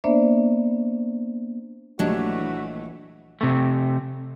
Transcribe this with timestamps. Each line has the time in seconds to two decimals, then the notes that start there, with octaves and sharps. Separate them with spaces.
0.04 A#3 B3 D4 C5 D5 E5
1.99 A#1 E3 F#3 G3 A3 D4 F#4 D#5
3.41 C3 A3